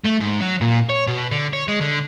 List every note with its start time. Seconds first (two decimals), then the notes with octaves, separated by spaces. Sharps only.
0.04 A3
0.20 G#2
0.40 F#3
0.61 A#2
0.89 C#5
1.07 B2
1.31 D3
1.53 C#5
1.68 G#3
1.81 D3